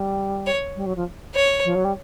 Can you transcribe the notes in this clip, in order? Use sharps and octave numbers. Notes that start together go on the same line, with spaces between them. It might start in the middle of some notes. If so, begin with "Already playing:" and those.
Already playing: G3
C#5
G3
F#3
F3
C#5
F3
F#3
G3